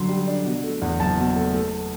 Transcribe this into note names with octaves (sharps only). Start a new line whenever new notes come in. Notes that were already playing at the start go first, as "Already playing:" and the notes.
Already playing: F#2 D3 D4 C6
G3
D4
B2
A3
E2
F#1 A5
B2
A3
A3